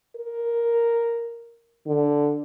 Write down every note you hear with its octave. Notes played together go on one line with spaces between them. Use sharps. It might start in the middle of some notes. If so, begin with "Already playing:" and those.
A#4
D3